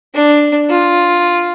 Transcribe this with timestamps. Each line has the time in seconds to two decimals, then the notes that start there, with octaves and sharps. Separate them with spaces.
0.15 D4
0.70 F4